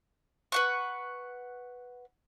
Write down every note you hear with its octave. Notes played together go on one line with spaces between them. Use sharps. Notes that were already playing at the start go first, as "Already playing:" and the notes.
B4 F#5 C#6